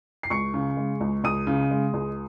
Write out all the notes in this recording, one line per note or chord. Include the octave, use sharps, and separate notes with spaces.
C7
C#2 C#6 C#7
C#3
G#3
C#2
C#2 D#6 D#7
C#3
G#3
C#2